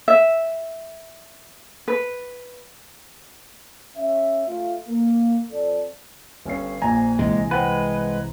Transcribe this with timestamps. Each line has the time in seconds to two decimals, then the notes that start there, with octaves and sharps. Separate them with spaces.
0.08 E5
1.88 B4
3.96 C#4 E5
4.47 A3 F4
4.87 A#3
5.51 F2 A4 D5
6.45 G1 C#4 C7
6.82 A#1 F2 A#2 G#5 A#5
7.19 C2 C3 E3 G#3
7.51 G#3 B4 C5 F#5 G5